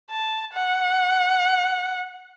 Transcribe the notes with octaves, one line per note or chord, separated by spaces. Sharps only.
A5
F#5